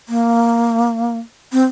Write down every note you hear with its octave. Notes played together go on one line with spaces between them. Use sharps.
A#3
C4